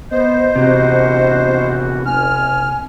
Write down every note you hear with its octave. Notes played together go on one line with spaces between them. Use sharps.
B3 C5 D#5
A#1 E2 C3 F#4
F#1 G#5 F6